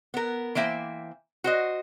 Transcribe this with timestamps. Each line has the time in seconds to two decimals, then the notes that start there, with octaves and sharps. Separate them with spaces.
0.14 B3 A#4
0.55 E3 A#3 C5 E5 G5
1.44 F#4 C5 D#5